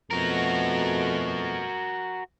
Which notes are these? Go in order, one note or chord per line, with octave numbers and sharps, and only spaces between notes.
F2 B2 A3 F#4 A#4